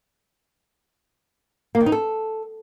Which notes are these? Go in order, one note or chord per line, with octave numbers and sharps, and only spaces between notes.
A#3
D#3
D#4
A4